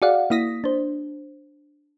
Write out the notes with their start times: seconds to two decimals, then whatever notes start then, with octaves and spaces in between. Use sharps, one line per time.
0.02 F#4 G#4 D5 F5 F#5
0.30 A#3 E4 D#6 A#6 B6
0.64 D4 C5